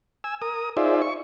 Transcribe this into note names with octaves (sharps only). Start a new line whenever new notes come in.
G#5 E6
A#4 D#6
D#4 F4 G#4 C5 D5 E5
C#6